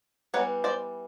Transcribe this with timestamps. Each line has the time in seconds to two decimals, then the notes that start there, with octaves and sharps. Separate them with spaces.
0.34 E3 G3 B3 B4 C#5
0.64 C5 D5